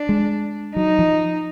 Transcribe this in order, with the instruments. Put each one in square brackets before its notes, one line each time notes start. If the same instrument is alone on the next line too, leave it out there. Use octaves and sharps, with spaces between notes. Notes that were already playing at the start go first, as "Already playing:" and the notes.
Already playing: [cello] D4
[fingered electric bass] G#3
[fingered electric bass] F#3 [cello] D#4
[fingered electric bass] F3